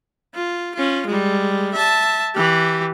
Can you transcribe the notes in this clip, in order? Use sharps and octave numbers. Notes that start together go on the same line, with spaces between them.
F4
C#4 F4
G3 G#3
E5 A5
E3 G4